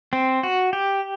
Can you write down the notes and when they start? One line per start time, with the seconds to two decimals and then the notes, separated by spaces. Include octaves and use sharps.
0.13 C4
0.43 F#4
0.73 G4